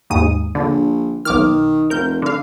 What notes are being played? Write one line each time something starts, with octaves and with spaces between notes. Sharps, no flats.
D#2 G#2 D#6
A#1 D3
B1 D#3 D6 F6
F1 A#4 G6
D3 F5